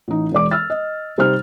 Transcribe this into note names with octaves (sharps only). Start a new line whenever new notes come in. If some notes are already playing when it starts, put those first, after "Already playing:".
A1 D#4
E1 G#3 D5 D6
E6 F6 A6
D#5
C3 G3 D#4 C5 F6